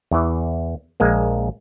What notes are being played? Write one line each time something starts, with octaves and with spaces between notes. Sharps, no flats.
E2 E3
A#1 G#3 A#3